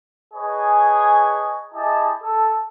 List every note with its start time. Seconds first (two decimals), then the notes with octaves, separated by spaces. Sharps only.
0.34 G#4 B4 C#5 D#5 G#5 A5
1.74 E4 G4 G#4 D#5 A5
2.23 A4